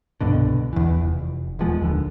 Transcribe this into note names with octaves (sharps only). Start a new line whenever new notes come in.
C2 G2 B2 D3
E2 E3
F1
D#1 E2 F3 G#3
D#2 D3